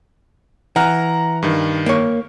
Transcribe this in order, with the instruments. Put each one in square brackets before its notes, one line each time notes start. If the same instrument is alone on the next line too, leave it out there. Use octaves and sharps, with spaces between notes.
[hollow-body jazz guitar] E3 [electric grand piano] F#5 A#5 F6
[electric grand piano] G2 D#3
[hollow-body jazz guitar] A#3 C#5